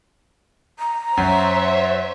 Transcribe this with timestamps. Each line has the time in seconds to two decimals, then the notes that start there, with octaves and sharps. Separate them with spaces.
0.79 A#5
1.17 F#2 C5 C#5 E5